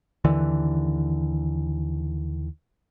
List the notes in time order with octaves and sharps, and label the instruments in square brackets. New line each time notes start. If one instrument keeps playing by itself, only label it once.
[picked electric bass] D#2 D3 E3